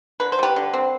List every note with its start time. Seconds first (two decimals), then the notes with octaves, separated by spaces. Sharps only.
0.20 D3 B4
0.32 C5
0.39 G3 G4 B4
0.56 D3
0.73 C4